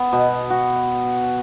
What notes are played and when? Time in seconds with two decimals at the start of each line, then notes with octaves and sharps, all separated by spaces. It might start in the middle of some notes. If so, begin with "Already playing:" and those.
Already playing: B3
0.13 B2
0.50 F#4